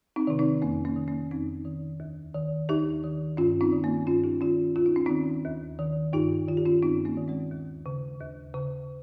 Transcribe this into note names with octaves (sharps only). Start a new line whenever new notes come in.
C4 D#4
C3 D#3
C4 D#4
F2 A#3 C#4
A#3 C#4
D#3
A#3 C#4
F2 C4 D#4
D#3
D#2
D#3
D#2 D#4 G4
D#3
G2 C#4 F4
C4 D#4
D#3
A#3 C#4
G2 C#4 F4
D#4 G4
D#3 C#4 F4
D#2 F4
D#4
C#4
D#3 C4 D#4
D#2
D#3
G2 D#4 G4
D#3 F4
G4
C#4 F4
G2 C4 D#4
A#3 C#4
D#3
G#3 C4
D#2
C#3
D#2
C#3